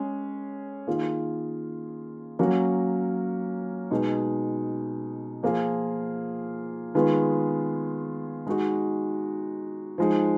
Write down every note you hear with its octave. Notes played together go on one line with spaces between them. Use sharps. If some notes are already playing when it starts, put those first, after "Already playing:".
Already playing: G#3 C#4 G#4
D#3 A#3 F4 G#4
F#3 A#3 C#4 F#4
B2 G#3 D#4
F3 A#3 F4 G#4
D#3 G#3 B3 F4 G#4
G#3 D#4 F#4
F3 G#3 D#4